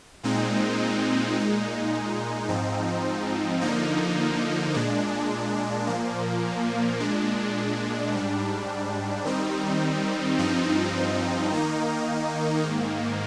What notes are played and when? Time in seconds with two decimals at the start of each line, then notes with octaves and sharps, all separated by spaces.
0.23 A#2 G#3 C4 D#4
1.36 A#2 G#3 D#4
2.48 G#2 F3 C4 D#4
3.61 D3 F3 A#3 D#4
4.74 A#2 G#3 D4
5.87 A#2 F3 A#3
7.00 A#2 G#3 D4
8.12 G#2 G3 D4
9.25 D#3 G3 C4 D#4
10.38 G2 F3 C4 D#4
11.51 D#3 A#3 D#4
12.64 G#2 D#3 A#3